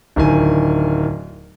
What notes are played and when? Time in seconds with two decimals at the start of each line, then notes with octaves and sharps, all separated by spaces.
0.16 D1 D#3 G#5